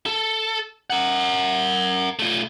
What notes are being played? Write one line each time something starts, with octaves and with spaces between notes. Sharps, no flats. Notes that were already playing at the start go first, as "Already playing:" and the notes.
A4
A#4 F#5
A3 F4